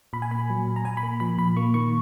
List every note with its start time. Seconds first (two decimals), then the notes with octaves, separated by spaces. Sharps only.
0.13 A#2 B5
0.22 G#5
0.31 A#3 B5
0.50 F#3
0.67 A#2
0.76 A#5
0.85 A#2 G#5
0.97 B5
1.03 A#3
1.20 F3 B5
1.38 A#2 B5
1.57 A#3 C#6
1.74 D#3 C#6